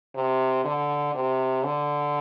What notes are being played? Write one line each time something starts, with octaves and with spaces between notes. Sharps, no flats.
C3
D3
C3
D3